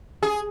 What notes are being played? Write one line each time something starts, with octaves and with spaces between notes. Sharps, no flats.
G#4